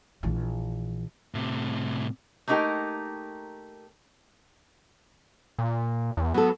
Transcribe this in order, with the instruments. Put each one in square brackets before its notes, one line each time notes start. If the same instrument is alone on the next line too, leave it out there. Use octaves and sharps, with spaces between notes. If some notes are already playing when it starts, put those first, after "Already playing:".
[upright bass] A#1 E3
[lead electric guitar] A2 C3
[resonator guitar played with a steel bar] A3 A#3 D4 D#4 G4 A#4
[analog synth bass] A#2
E2
[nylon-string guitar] F#3 A4 [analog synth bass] B3